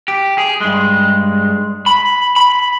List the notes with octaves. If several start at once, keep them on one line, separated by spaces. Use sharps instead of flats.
G4
G#4
G2 G#3
B5
B5